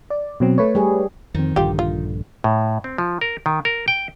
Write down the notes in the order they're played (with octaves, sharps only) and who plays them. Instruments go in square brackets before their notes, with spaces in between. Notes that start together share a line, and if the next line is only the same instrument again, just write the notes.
[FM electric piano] D5
B2 F#3 C4
A3 B4 C#5
[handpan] G3 G4 G#4
[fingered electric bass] F2 C4 [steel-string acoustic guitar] D#3
[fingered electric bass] A#1 G2 D3 [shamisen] F4 G4
[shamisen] F4
[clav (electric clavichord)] A2
C4
F3
A#4
D#3
A#4
G5